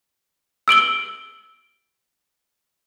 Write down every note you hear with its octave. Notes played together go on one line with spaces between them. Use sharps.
E6 D7 F#7 G7